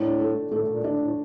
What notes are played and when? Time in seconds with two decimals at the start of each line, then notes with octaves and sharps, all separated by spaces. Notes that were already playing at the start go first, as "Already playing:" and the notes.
Already playing: A2 D4
0.19 A3
0.51 A2 A3
0.68 A#2
0.84 A2 D4
0.99 A2